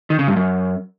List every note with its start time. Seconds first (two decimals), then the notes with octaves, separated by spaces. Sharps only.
0.10 D#3
0.19 C#3
0.28 G2
0.36 F#2